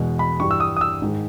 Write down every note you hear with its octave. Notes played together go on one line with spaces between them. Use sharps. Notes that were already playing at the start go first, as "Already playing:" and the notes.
Already playing: E2 B2 G#3
B5
G2 E3 G3 C#6
E6
D#6
D#6
E6
G#2 D#3 G#3